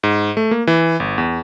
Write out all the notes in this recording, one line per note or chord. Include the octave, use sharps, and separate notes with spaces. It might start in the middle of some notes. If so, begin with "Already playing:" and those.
G#2
A3
A#3
E3
G1
E2